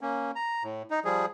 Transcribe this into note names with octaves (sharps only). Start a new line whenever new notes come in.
A#3 C#4
A#5
A2
D#4
F3 G3 G#4